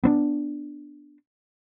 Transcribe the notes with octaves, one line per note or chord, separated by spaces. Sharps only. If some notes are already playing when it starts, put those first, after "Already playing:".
B3 C4 D4